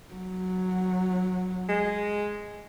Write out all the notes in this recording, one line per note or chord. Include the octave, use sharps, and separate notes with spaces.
F#3
G#3